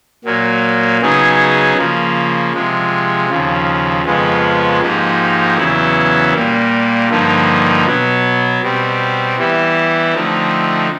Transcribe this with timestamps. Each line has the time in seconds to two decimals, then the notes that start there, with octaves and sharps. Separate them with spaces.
0.25 A#2 F#3 A#3
1.01 C#3 F#3 B3 D#4 G#4
1.77 C#3 F3 A#3
2.54 C3 F3 G#3
3.29 D#2 C#3 F3
4.05 F2 C#3 F3 G#3 B3
4.82 G#2 F3 A#3 D#4 G4
5.57 E2 C#3 F#3 B3 E4
6.33 A#2 G3 A#3
7.09 G2 D3 F3 A#3 D#4
7.85 B2 F#3 B3
8.62 B2 G3 C4
9.37 E3 G3 B3 E4
10.14 D3 F3 A3 C4 D#4